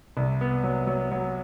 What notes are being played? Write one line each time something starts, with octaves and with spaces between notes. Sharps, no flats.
C2
B3
F#3
F#3
F#3